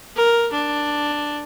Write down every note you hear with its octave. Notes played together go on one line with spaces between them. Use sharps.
A#4
D4